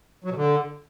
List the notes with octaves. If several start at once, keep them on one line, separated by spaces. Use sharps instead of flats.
F#3
B2
D3